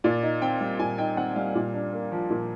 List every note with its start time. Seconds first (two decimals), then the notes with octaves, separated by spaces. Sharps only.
0.04 A#2 D5
0.23 D#4
0.42 C4 G5
0.61 G3
0.79 A#2 G#5
0.98 D#4 G5
1.17 C4 F#5
1.36 G3 F5
1.55 A#2
1.74 D4
1.93 A#3
2.12 F3
2.30 A#2